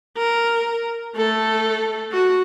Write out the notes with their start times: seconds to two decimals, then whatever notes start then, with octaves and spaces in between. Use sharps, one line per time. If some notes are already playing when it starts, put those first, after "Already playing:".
0.18 A#4
1.17 A3 A4
2.12 F#4